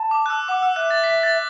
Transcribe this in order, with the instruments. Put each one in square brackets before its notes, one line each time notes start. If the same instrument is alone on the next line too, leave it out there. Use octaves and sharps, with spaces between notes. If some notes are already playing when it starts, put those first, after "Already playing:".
Already playing: [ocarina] A5
[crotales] D6
F#6
E6
[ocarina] F#5 [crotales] D6
[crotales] E6
[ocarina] E5 [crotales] F#6
[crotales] A6
B6
A6